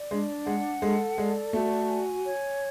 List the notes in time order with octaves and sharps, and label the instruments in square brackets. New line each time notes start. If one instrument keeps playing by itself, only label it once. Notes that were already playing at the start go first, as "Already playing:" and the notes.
Already playing: [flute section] D5
[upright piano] G#3 [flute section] D4
[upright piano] G#3 [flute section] F#5
[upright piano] G#3 [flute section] A4
[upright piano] G#3 [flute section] D5
[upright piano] A3 [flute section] F#4
[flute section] G#5
C#5